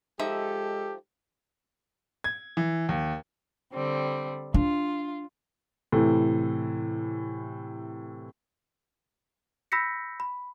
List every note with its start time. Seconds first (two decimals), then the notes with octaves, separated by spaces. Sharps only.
0.19 F3 G#3 D#4 G4 A4 E5
2.24 G#6
2.57 E3
2.89 D#2
3.73 D3 G3 C4
4.54 D4 F4
5.92 A2 C3 E3
9.72 B5 E6 G6 A#6 B6 C#7
10.20 B5